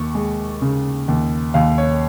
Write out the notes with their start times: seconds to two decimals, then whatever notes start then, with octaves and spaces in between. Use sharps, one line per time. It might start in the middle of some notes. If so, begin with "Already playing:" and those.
Already playing: D#2 C#6
0.15 G#3
0.62 C#3
1.08 D#2
1.54 D#2 F5
1.78 C#5